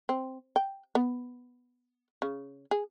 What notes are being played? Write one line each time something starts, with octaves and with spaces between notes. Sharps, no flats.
C4
G5
B3
C#3
G#4